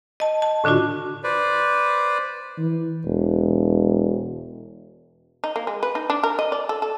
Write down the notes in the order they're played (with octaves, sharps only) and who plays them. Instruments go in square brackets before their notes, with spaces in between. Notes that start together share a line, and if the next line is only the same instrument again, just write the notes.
[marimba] D#5 A5
A5
A2 D3 D4 F4 F#4
[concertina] B4 C5 D5
[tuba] E3
E1
[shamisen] D#4
A#3
G#3
B4
D#4
D4
A#4
D#5
D5
A4
A4